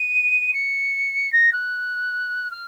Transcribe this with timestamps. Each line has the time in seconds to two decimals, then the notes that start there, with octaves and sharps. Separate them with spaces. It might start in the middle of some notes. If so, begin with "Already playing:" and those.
Already playing: D#7
0.53 C#7
1.32 A#6
1.52 F#6
2.51 F6